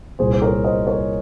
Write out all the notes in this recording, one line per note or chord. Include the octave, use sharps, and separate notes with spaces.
C2 A#2 G#4 C5
C5
A#4 C#5
C5 D#5
A#4 C#5